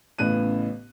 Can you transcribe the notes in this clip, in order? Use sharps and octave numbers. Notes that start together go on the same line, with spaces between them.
A1 A2 C#3 B3 F#6 D#7